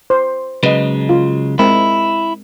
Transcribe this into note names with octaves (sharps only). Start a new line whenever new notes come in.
C5
C#3 F#3 G#3 B4 D#5
F4
G#3 C4 E4 A#4